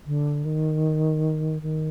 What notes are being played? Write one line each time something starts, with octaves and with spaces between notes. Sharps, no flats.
D3
D#3
D#3